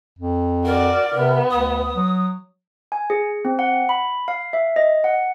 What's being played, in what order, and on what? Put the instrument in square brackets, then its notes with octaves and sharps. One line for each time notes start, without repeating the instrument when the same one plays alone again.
[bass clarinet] F2
[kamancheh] F#4 D5 [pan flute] A#4
[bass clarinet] C3 [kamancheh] B3
[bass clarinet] D2 [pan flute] D#6
[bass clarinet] F#3
[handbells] G#5
G#4
C4
F#5
B5
F5
E5
D#5
F#5